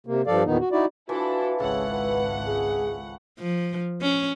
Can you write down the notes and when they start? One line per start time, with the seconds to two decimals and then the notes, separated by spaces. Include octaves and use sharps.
0.07 C3 A#3
0.27 G2 F3 A4 D5 F5
0.46 E2 A#2 D#3 B3 D#4
0.60 F#4
0.72 D#4 E4 F#4 D5
1.09 E3 F3 D4 E4 F#4 A4
1.60 G#1 C#2 C#3 A4 C#5 F#5
1.91 B4
2.47 G#4
3.39 F3
4.01 C#4